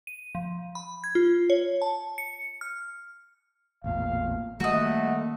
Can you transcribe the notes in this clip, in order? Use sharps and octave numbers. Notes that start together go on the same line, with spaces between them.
D#7
F3
B5
G#6
F4
C#5
A5
C#7
F6
A1 E2 A#2 F5
D#3 G3 A3 A#3 F#4 D#5